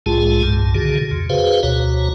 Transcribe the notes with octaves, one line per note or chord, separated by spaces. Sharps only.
C2 A2 G#3 F4 G#4 A5
C2 G2 A#2 A5
A#2 D3 D#3 F#4 G#4
F2 C#3
F#4 G#4 B4 C5 F5
D2 B2 F#4 C#5 A#5